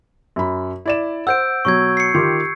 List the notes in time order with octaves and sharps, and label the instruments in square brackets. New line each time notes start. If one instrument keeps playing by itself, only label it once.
[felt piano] F#2 B5
E4 D5 E7
[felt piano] C5 F#5 [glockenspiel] E6 G6 D7
[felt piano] B2 F#3 [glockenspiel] C#6 G#6
[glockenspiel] C7 C#7
[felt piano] D#3 F4 G4